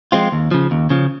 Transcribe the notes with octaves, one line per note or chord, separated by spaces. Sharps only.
F3 G#3 C4 F4
D#2
C#3 F3
D#2
C#3 F3